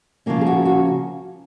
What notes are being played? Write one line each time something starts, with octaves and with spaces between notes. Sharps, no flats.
C#3 F3 A#3 C#4
G#4
F#4
F#4